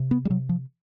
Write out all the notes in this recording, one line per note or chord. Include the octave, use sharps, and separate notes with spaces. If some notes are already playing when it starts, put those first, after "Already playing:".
Already playing: C3
B3
G3
C3 F#3
F3